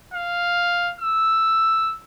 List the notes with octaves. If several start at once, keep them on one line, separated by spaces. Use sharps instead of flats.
F5
E6